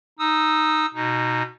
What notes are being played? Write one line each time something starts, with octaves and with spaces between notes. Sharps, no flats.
D#4 D#6 E6
B2 D#4